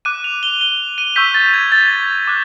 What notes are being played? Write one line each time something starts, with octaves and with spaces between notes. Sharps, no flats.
D6 F#6 D#7
F7
G7
G7
D#7
C#6 E6 G6 B6
A6
G#6
A6
D6 F#6